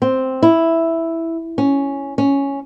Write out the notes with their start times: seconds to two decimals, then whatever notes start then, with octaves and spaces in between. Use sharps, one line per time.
0.02 C4
0.42 E4
1.58 C#4
2.18 C#4